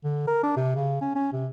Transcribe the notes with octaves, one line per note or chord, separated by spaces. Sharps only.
D3
A#4
D4
C3
C#3
C#4
C#4
C3